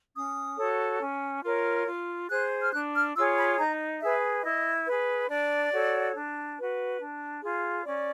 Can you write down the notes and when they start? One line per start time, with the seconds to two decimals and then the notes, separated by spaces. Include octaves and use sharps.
0.15 C#4 D#6
0.58 F#4 A4 C#5
1.01 C#4
1.43 F4 A#4 C#5
1.87 F4
2.30 G#4 C5 F#6
2.61 F6
2.73 D4 F#6
2.94 F6
3.15 F4 G#4 C#5 E6
3.37 B5
3.58 D#4 A#5
4.01 G#4 B4 E5
4.44 E4 D#5
4.87 G#4 B4
5.29 D4 D5
5.72 F#4 A4 C#5
6.15 D4
6.58 F#4 B4
7.00 D4
7.43 F4 G#4
7.86 C#4 D5